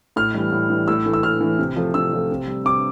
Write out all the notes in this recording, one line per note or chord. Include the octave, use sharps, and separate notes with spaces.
A2 F6
E3 G3
A2
E3 G3
A2 E6
E3 A3
E6
A2 F6
E3 A3
C3
F3 A3
C3 E6
F3 A3
C3
G3
C3 D6